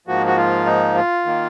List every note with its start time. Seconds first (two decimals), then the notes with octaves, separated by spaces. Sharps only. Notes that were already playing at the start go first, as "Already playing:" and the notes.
0.07 G#2 F3 A#3 F#4
0.26 F#4
0.37 F4
0.66 D#4
0.95 F4
1.26 D#3 A#3